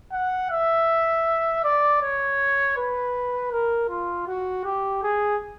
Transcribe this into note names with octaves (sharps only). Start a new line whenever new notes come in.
F#5
E5
D5
C#5
B4
A#4
F4
F#4
G4
G#4